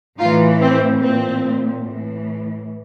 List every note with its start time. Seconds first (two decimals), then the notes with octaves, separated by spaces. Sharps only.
0.19 A2 E3 D#4 F4
0.61 C4
1.01 A#2 C4
1.84 A2 E3